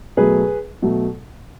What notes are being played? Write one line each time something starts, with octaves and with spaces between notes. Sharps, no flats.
B2 F#3 A3 G#4 B4
B2 F#3 A3